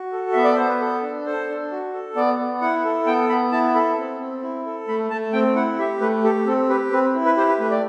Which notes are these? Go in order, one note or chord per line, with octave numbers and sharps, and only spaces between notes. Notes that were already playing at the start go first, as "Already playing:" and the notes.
Already playing: F#4
A4
B3 E5
D5
B3 C5
B4
A4
D4
A4 C5
D4
F#4
A4
B3 D5
B3
E4 F#5
A4
B3 G5
B3 B5
E4 A5
A4 B5
C4
C4
E4
A4
A3 B5
A3 A5
C4 G5
E4 F#5
G4 E5
A3 B4
G4 A4
C4 A4
G4 B4
C4 B4
E4
B4
G4 C5
B4
A3 B4
D5